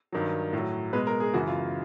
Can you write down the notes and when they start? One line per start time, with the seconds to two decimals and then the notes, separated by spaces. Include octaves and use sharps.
0.12 G2 D#3 F#3
0.53 A2 F#3
0.93 B2 G#3 B4
1.07 A#4
1.20 G#4
1.33 F#2 C#3 E3 F#4
1.48 F4